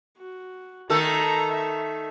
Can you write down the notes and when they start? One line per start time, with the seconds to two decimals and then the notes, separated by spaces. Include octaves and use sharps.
0.18 F#4
0.90 D#3 A3 A4 A#5
1.52 E5